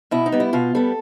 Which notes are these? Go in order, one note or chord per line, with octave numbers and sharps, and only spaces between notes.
B2 E4
D#4
G3 B3
E4
B2 F4
G3 B3 A4